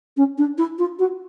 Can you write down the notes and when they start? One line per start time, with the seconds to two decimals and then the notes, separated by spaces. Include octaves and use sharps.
0.17 C#4
0.38 D4
0.58 E4
0.78 F4
0.99 F#4